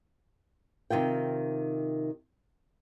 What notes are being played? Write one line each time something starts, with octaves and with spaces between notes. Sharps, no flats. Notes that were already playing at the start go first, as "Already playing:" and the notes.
C3 D#3 F4 G5